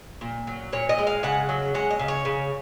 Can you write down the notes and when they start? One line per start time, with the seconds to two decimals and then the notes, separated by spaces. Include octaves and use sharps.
0.21 A#2
0.47 F#3
0.73 A#2 C#5
0.89 D#5
0.98 G#3
1.07 F5
1.23 C#3 F#5
1.49 F#3
1.74 G#3 F#5
1.90 D#5
1.99 C#3
2.08 C#5
2.25 C#3